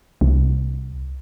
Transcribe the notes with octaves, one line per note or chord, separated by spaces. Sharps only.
C2